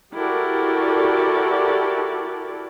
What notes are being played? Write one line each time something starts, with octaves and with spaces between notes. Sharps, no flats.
E4 F#4 G4 A4 A#4 D5